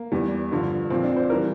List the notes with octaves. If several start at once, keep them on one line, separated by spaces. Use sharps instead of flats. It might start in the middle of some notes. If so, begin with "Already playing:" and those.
Already playing: A#3
E2 E3 G3
G2 D3 F3
A#2 F3 C4
D4
C5
E3 G3 A#4